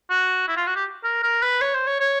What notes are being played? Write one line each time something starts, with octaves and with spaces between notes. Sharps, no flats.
F#4
E4
F4
F#4
G4
A#4
A#4
B4
C#5
C5
C#5
C#5